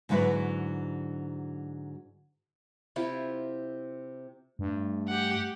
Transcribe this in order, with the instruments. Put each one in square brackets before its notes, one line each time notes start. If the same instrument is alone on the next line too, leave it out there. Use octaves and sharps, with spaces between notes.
[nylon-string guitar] G#2 D3 F#3 E4 F#4 B4
[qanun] C3 E4 F4
[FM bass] G2 [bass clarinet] A3
[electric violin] G4 F#5